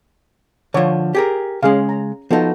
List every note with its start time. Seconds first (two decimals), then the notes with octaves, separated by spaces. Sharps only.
0.74 D3 F3 C#5
1.15 G4 G#4 A#4
1.63 C#3 G#3 C#4 G#4 F5
1.89 A#5
2.31 F3 B3 D#4 F#4 A4